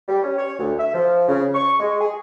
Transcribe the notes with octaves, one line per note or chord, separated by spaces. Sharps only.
G3
C#4
C#5
D2
E5
F3
C#3
C#6
G#3
G#4